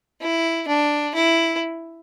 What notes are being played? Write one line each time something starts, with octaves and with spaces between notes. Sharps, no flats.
E4
D4
E4